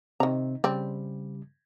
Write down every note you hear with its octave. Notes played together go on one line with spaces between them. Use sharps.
C3 D#3 C4 A#5
C#3 G3 C4 D5